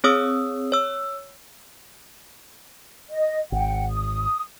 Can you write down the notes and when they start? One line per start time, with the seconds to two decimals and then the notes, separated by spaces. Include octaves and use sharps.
0.04 C4 G#4 C#5 D#6 E6
0.72 C#5 E6
3.09 D#5
3.52 G#1 F#5 G5
3.89 D#6